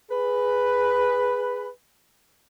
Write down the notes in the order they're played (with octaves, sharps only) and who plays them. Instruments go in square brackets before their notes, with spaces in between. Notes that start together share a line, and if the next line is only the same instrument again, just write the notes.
[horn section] G#4 B4